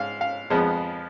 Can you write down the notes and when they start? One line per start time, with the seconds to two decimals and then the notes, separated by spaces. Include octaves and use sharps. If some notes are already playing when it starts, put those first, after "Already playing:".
Already playing: G#2 F5
0.21 F5
0.50 F2 F3 G#3 B3